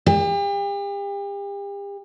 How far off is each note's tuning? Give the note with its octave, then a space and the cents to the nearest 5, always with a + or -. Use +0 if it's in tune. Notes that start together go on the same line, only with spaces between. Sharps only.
G4 +40